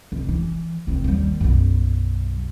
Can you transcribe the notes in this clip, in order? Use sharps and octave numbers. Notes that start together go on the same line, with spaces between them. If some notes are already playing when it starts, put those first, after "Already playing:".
F1
E3
F1 C4
D#2 G3
B1 F#2